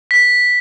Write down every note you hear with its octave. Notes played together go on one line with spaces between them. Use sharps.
B6